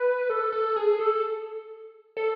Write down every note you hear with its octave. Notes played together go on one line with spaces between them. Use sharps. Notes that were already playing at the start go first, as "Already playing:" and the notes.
Already playing: B4
A4
A4
G#4
A4
A4